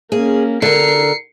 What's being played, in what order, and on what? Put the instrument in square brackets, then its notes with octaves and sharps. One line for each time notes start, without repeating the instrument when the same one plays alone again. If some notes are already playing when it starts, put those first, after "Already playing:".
[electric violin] A#3 C#4 [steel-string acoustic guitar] G#4
[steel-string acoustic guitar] D3 A#4 [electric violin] C7 C#7